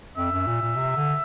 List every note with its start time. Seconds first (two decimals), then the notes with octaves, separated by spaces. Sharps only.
0.17 F2 E5
0.31 F#2
0.47 A#2
0.62 A#2
0.76 C3
0.96 D3